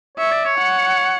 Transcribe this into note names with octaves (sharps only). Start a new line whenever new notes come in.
C#5 E5
D5
C#5
F#5